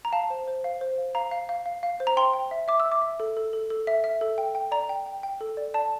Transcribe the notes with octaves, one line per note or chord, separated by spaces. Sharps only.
A#5
F5 A5
C5
C5
F5
C5
F5
F5 A#5
F5
F5
F5
F5
C5
A#5
G5 C6
G5
E5
E5 D6
E6
E5
D6
E5
A4
A4
A4
A4
E5
E5
A4
G5
G5
D5 A#5
G5
G5
G5
A4
D5
D5 A5